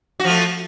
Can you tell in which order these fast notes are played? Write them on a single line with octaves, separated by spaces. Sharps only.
F#4 F3 A3